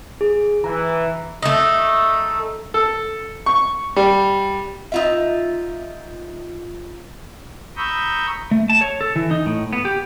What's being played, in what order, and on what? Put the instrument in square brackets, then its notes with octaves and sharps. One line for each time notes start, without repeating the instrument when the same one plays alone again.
[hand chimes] G#4
[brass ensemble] E3 [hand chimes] A#5
[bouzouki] A3 D#4
[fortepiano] A4
C#6
G3
[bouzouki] D#4 F4 E5
[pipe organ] A#5 B5 C#6 D#6 E6 G6
[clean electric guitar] A3
A5
C#5
A4
E3
D#4
A2
B3
G4